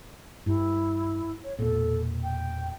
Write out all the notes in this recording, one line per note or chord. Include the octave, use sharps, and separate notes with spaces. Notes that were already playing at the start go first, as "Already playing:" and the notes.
G2 E4
C#5
E1 A#2 A4
G5